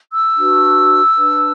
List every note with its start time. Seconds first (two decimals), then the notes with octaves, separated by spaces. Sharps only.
0.10 E6
0.37 D4 F#4 B4
1.16 D4 B4